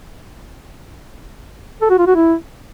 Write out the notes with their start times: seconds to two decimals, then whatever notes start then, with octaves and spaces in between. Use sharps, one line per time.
1.82 A4
1.90 F#4
1.99 F4
2.07 F#4
2.15 E4